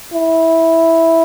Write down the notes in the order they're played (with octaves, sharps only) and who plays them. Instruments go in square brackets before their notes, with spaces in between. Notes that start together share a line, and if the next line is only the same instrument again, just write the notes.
[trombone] E4